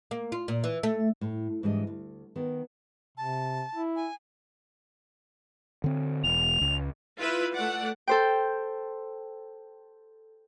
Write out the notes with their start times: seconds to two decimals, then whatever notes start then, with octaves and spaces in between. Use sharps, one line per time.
0.11 A#3
0.32 F4
0.48 A#2
0.64 E3
0.83 A3
1.21 A2
1.63 G#2 E3 G3 D4 D#5
1.87 D2
2.36 D#3 B3 A#4
3.18 C3 A5
3.75 E4
3.96 G#5
5.84 D3 C4
6.24 E1 F7
6.61 C#2
7.18 E4 F4 B4 E5
7.54 A3 D5 F#5
8.07 A4 C5 G5